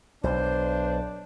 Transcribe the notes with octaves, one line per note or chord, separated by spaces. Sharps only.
B1 D4 C5